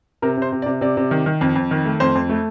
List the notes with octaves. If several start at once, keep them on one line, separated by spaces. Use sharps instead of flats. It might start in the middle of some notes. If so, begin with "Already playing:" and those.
C3 A#4
C3 C5
C3
D5
C3
C3 D5
C3
D#3
D#3
F2
F2
D#3
A3
F2 C5
F2
A3